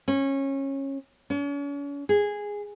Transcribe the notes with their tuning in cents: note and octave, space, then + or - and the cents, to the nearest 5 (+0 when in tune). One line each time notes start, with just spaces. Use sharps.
C#4 -20
C#4 +40
G#4 -10